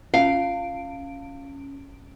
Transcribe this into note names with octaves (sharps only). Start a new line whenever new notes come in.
C#4 F5 D7